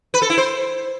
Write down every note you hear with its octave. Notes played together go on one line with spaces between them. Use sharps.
B4
A4
E4
C5